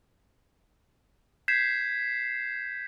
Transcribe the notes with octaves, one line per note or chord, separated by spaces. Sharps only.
G6 G#6 B6 C7 E7